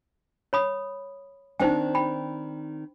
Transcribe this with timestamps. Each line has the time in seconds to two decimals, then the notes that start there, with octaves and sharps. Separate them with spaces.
0.53 C#5 B5 D#6
1.60 D#3 C4 D4 D#4 C5 G5
1.95 G5 B5